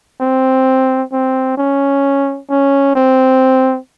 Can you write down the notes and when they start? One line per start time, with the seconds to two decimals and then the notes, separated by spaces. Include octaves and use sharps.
0.21 C4
1.12 C4
1.57 C#4
2.50 C#4
2.96 C4